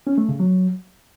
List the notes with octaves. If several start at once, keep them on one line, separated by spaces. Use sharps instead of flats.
C#4
A3
C#3
F#3